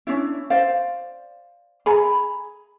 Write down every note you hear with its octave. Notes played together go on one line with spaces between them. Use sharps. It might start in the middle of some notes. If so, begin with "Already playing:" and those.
C#4 D4 E4
C5 D5 F5
G#4 G#5 A#5 B5